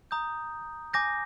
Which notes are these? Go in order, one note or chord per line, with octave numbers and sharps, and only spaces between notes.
A#5 D#6 G6
G#5 D6 G6 A#6